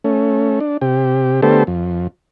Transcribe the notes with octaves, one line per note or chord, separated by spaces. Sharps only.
A3 C#4
D4
C3 G4
D3 A3 B3 G4 A4 C5
F2